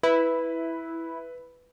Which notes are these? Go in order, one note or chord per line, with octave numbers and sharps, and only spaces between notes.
E4 B4 B5